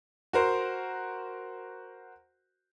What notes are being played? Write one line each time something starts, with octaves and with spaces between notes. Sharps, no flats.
F#4 A#4 C5